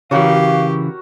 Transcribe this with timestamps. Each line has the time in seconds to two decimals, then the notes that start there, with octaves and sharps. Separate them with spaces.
0.11 C#3 E3 F#4 G4 A#4 C#5 F5